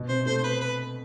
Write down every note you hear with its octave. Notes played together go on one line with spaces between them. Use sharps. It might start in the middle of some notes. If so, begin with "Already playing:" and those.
Already playing: B2
C3 C5
A3 C5
C5
B4
B4